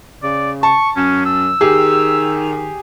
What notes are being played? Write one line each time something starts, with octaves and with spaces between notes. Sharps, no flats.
C#3 D5
A5 C#6
F#2 C#4
E6
D#3 G4 G#4